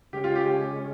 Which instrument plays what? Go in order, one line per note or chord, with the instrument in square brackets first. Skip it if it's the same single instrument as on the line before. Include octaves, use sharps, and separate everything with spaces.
[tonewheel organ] C#3 G#3 C#4 [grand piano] G4
[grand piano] F4
G4